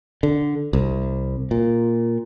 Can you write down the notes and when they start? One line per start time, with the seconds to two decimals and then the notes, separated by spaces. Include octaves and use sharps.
0.23 D3
0.73 C2
1.51 A#2